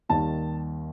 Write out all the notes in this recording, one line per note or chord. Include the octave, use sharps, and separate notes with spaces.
D#2 D#3 G3 A5